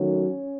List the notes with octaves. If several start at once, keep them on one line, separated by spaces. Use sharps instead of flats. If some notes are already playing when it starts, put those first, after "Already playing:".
Already playing: D#3 F#3 A3 C#4